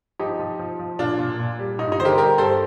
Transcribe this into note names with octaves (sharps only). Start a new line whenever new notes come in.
F3 D#4 G4
F3
F3
F3
A#2 D4 F4
A#2
A#2
G3
G2 D#4
D#4
D3 C5
G4 A#4
G3 G4 A#4
G2 A4 C5